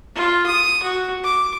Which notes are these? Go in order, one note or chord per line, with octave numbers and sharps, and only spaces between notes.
F4
D#6
F#4
D6